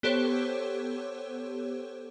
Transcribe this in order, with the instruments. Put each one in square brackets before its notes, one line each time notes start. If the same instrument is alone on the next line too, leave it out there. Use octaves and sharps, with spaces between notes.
[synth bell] B3 G4 A4 C5 C#5